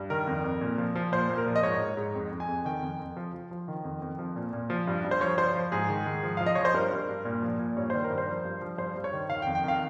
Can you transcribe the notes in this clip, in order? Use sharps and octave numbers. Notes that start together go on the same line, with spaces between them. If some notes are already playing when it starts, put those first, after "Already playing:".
Already playing: G2
D#3 A#4
F2
F2
A#2
F3
F3
A#2 C5
A#2
A#4
F3
D#5
G#2 C#5
G#2
G#2
F2
F2
G#5
F2
D#3 G5
F2
F2
F3
F3
F3
D#3
F2
F2
F3
A#2
A#2
F3
G2
G2
C5
F3 C#5
F3 C5
F3
G#2 G#4
D#3
G#2
F3
F3 F5
D#5
F3 C#5
C5
G2 A#4
G2
G2
A#2
F3
A#2
G2 C#5
D#3 C5
A#4
G2
C5
F3
G2
F3
G2 C5
G2
C#5
D#3
D#3 F5
G5
F2
G5
D#3 F5